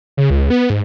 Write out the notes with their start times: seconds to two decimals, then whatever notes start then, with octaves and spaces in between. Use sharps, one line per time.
0.17 C#3
0.30 C#2
0.50 B3
0.70 G#2